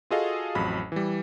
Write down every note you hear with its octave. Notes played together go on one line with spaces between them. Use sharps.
F4 F#4 G#4 A4 D#5 F5
A1 F2 F#3 B5
E3 G3